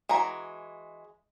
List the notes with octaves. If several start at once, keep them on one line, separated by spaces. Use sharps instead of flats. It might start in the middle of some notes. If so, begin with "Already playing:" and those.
E3 G#3 F#4 A#5